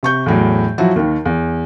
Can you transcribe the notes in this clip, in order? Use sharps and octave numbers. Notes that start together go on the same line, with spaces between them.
C3 C#6 G6
E2 A2 F#3
F3 F#3 E4 F#4
D#2 D#3
E2